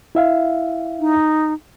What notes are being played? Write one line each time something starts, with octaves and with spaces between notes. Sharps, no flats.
E4 E5 F5
D#4